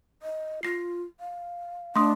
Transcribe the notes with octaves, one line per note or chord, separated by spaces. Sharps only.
D#5
F4 A#6 C7
F5
A3 D4 C6 D#6